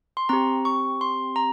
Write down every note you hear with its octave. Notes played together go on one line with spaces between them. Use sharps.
C6
C4 G4 A#5
C#6
C6
A#5